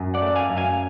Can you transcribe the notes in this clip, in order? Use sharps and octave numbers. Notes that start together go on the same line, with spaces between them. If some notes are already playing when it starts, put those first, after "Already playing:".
Already playing: F#2
D5 F#5
A3
F5 G#5
F#2
F5 G#5